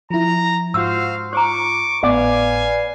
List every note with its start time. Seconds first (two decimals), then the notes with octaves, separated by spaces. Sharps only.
0.10 F3 E4 A#5
0.74 G#2 F4 F#4 C5 F5 E6
1.33 C5 A#5 C#6 D6
2.03 G#1 A2 B3 B4 D5 F5 G#5